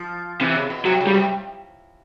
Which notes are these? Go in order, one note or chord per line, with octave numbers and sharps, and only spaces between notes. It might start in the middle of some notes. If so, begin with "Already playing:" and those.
Already playing: F3
C3 E3
C#3
B2
C3 F#3
C#3
G3
C3